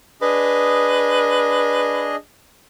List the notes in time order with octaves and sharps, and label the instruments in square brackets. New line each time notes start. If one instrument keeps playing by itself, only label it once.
[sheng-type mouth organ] D4 G#4 D#5 [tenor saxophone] B4